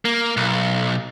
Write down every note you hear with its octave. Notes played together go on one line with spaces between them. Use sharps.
A#3
B1